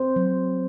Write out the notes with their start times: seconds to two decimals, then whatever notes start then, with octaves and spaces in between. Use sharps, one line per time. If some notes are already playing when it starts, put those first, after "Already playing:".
Already playing: C4 C5
0.16 F#3